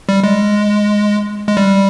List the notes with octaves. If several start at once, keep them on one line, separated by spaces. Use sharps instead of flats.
G3
G#3
G#3
G3